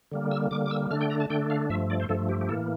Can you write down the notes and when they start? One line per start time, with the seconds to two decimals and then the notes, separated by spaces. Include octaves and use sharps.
0.12 D3 G3 A#3
0.31 E6
0.51 D3 G3 A#3 D6
0.66 D6
0.71 E6
0.91 D3 A3 D4 F6
1.01 G5
1.10 A#5
1.20 A5
1.30 D3 A3 D4 G5
1.50 F5
1.70 G2 F3 A3 E5
1.90 D5
2.00 C5
2.09 G2 F3 A3 A4
2.29 G4
2.41 G4
2.49 A2 E3 A#3 A4